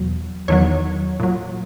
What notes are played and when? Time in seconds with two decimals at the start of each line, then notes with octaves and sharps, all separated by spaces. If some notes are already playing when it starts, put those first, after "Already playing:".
Already playing: E2 B2 F#3
0.48 E2 D#3 F#3 C#5
1.20 A#2 F#3